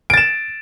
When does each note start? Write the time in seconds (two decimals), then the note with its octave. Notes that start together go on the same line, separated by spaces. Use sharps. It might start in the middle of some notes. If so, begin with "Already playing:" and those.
0.10 D7
0.14 A6
0.17 E7